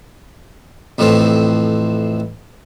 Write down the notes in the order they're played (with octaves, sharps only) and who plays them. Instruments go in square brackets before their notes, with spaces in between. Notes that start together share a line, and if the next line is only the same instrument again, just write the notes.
[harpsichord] F2 A2 E3 F3 C4